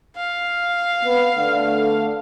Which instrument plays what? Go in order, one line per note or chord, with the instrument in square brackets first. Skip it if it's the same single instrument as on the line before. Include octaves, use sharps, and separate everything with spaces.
[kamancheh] F5
[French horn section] B3
D3 A3